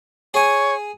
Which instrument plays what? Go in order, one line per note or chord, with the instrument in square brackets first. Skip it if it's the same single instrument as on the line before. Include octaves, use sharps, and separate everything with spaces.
[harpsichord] G#4 G#5 [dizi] C#5